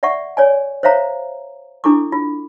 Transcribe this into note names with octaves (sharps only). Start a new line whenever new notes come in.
D5 E5 F#5 C#6
C#5 D5 G#5
C5 C#5 E5 F5 A#5
D4 E4 A4 C#6 D6
F4